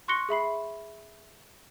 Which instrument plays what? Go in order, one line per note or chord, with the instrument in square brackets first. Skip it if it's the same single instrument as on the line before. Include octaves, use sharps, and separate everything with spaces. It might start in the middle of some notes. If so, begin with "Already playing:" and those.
[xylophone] C6 C#6 F#6 A#6 C#7 G7
G#4 E5 B5 C7